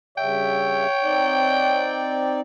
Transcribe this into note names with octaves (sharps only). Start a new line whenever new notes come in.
G2 C#3 C#5 E5 G5
C4 D#4 D5